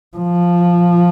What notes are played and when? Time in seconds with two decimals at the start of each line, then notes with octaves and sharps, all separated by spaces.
0.17 F3